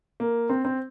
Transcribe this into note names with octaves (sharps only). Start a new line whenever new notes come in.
A#3
C4
C4